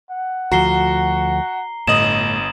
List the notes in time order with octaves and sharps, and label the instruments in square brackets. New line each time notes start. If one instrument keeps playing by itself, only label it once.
[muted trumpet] F#5
[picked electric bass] D2 F3 [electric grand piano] F#4 [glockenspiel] A#5 C7 G7
[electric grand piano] G1 D#5 D#6 [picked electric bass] A2 [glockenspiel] E7 F#7